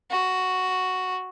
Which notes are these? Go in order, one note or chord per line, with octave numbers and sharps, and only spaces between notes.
F#4